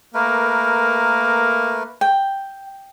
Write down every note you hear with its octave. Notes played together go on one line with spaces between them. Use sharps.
A3 A#3 A#4 B4
G5